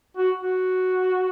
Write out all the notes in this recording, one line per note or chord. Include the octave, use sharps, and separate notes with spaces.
F#4
F#4